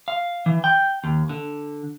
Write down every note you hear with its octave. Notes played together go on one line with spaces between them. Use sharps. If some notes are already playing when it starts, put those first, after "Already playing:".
F5
E3
G5
D#2
D3